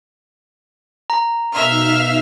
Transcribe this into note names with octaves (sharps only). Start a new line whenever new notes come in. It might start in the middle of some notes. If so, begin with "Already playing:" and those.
A#5
B2 D#4 E5 F5 F6 B6